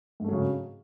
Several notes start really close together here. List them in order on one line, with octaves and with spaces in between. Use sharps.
G#2 A3 F#3 C#3